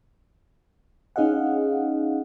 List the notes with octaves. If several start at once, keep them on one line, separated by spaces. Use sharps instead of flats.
C#4 D#4 G#4 D#5 F5 F#5